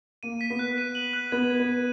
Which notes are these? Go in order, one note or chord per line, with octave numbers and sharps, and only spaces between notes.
A#3 D#7
B6
B3
F#6
D#7
F#7
F#6
B3 G#6
G#6
B3
D#7